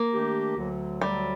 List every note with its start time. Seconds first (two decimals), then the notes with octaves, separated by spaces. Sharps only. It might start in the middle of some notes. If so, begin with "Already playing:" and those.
Already playing: A#3
0.11 D#3 A3 D4 G4
0.56 D2 D3 F#3
1.01 D2 D3 F#3 G3